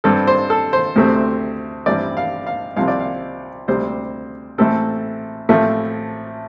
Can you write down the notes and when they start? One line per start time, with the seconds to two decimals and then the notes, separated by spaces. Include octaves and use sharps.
0.04 G2 G3 C4 A4
0.27 C5
0.50 A4
0.73 C5
0.96 D2 C3 A3 C4
1.86 A1 G2 G3 C4 D5
2.17 F5
2.46 F5
2.76 C2 C3 F3 C4 F5
2.88 D5
3.00 F5
3.68 D2 C3 G3 C4 C5
4.58 A1 A2 A3 C4 A4
5.49 A1 A2 F3 A3 C4